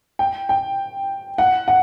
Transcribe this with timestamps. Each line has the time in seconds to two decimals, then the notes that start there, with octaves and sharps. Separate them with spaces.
0.19 G5
0.49 G5
1.38 F#5
1.68 F#5